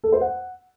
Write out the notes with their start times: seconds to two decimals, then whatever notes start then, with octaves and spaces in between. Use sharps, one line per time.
0.04 A4
0.12 C5
0.21 F#5